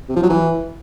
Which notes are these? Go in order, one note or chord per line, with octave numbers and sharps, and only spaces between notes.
C3
F3
F#3
E3